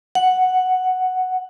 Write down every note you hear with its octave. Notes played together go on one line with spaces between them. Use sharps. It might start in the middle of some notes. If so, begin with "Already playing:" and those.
F#5